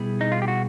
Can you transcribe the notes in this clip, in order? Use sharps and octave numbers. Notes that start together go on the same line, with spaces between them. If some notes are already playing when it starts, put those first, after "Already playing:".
Already playing: B2 G3 B3 E4 G#4
D#4
F4
G4
F#4